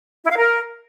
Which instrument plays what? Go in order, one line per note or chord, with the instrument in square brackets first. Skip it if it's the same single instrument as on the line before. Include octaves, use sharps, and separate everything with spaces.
[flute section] E4
F5
A#4